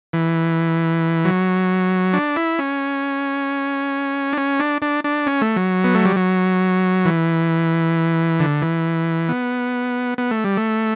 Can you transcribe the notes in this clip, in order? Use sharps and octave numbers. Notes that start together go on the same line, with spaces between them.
E3
F#3
D4
E4
C#4
D4
C#4
D4
D4
D4
C#4
A3
F#3
B3
A3
G3
F#3
E3
D3
E3
B3
B3
A3
G3
A3